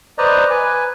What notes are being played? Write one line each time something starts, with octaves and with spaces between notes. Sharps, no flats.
B4 C5 D5 D#5 A#5
B4 G#5